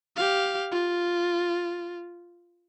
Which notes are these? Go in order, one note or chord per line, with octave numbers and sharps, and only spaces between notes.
G4 F5
F4